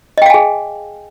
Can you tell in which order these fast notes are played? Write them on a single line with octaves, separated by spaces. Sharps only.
D#5 G5 F5 G#5 G#4